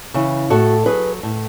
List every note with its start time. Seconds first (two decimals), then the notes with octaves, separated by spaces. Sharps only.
0.14 C#3 E3
0.50 A2 F#4 A4
0.86 F#3 G#4 B4
1.23 A2